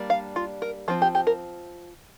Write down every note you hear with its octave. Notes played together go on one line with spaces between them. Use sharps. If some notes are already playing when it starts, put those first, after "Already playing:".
Already playing: G3 A#3 D4
F5
F4
A#4
F3 C4 F4
G4
G4
A#4